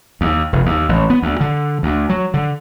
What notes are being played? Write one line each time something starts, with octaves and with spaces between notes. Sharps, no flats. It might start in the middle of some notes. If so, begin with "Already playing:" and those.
D#2
F1
D#2
A1
B3
D2
D3
D2
F#3
D3